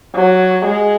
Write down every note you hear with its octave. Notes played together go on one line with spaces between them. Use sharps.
F#3
G#3